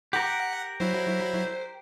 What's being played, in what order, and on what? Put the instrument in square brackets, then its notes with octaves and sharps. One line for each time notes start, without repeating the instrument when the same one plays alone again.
[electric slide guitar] G4 A#4 [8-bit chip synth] F#5
[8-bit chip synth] F#3 E4 [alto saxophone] C5